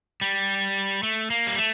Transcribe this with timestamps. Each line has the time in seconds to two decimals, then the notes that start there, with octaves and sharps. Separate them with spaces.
0.21 G3
1.03 A3
1.30 A#3
1.47 G3
1.58 A3